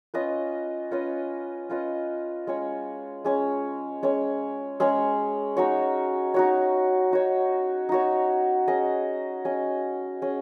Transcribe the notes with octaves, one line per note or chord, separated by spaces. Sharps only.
C#4 F4 B4 D#5
C#4 F4 B4 D#5
C#4 F4 B4 D#5
G#3 C#4 G#4 C#5
G#3 C#4 G#4 C#5
G#3 C#4 G#4 C#5
G#3 C#4 G#4 C#5
D#4 F#4 C#5
D#4 F#4 C#5
D#4 F#4 C#5
D#4 F#4 C#5
C#4 G#4 D#5
C#4 G#4 D#5
C#4 G#4 D#5